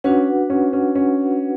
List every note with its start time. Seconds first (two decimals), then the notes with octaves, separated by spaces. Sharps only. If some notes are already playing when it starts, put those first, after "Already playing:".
0.04 C#4 D4 F#4 B4 F#5
0.50 C#4
0.73 C#4
0.95 C#4